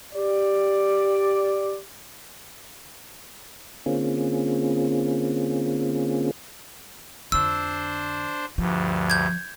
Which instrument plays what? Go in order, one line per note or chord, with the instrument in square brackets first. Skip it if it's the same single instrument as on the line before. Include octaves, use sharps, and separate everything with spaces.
[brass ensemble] G4 D5
[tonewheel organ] D3 A#3 C4 C#4 F4 G#4
[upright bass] F2 D3 [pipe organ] D4 C5 [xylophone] E6
[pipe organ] D2 G2 [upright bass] F3
[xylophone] G6 G#6